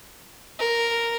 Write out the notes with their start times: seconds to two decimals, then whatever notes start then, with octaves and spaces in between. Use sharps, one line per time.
0.59 A#4